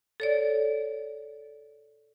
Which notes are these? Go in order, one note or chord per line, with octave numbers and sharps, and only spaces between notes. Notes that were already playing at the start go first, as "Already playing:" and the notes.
A4 C#5 D5